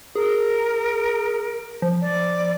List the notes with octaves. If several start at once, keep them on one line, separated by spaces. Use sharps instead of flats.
G#4 A#4
F3
D5